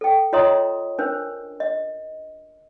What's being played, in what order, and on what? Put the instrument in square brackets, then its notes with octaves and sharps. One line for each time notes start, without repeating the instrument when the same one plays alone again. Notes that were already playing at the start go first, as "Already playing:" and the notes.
[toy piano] A4 G5
F4 C#5 D#5 A#5 C6 D#6
C#4 D4 A#4 C5
D#5